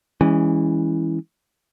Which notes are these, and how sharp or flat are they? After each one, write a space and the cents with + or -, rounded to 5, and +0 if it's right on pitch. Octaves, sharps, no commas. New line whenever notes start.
E3 -10 G#3 -25 C#4 +0